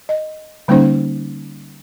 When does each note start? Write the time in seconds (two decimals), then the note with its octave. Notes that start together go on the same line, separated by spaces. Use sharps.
0.09 D#5
0.68 D3 G3 A#3 C#4 D#4 C5